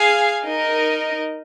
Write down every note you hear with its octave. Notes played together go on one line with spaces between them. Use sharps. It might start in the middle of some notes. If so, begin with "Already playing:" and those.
Already playing: G#4 F5 G#5
D#4 A#4 D#5